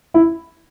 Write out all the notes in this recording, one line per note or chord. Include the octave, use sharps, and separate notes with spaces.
E4